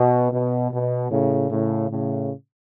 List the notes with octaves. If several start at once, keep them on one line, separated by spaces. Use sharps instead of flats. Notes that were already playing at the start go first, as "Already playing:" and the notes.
Already playing: B2
B2
B2
A2 C#3
A2 C#3
A2 C#3